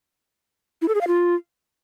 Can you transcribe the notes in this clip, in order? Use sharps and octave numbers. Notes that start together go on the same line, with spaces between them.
E4
A4
G#4
F5
F4